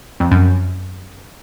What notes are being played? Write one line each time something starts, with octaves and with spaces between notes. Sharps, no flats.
F2
F#2